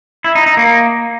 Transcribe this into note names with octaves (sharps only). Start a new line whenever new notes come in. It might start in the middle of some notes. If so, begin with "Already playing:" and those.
E4
D#4
D#4
A#3